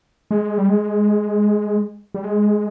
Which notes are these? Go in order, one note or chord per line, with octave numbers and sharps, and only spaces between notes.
G#3
G3
G#3
G3
G#3